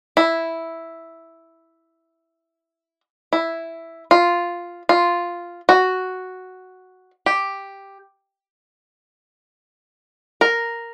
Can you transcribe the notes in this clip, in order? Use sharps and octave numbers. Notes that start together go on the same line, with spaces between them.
E4
E4
F4
F4
F#4
G4
A#4